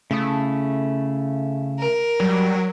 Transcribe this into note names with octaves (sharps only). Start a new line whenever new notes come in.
C#3 A3 E4 D#6
A#4
F#3 G3